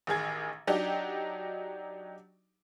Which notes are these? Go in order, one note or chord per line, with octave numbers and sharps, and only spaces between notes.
A1 D#3 G#4 G#6
F#3 D4 D#4 G4